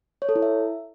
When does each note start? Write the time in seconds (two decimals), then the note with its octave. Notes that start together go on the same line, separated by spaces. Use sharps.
0.22 C#5
0.29 A4
0.36 E4
0.42 E5